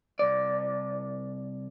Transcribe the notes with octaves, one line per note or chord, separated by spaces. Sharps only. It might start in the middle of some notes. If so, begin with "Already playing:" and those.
C2 D5